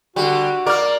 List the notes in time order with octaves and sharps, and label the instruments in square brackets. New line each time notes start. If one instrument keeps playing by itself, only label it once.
[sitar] D3 G3 [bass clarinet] F#4
[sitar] A#3 A#4 [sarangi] D5 [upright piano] D6 F6